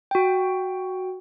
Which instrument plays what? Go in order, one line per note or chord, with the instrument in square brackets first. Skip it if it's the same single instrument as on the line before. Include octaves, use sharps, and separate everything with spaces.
[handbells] F#4 G5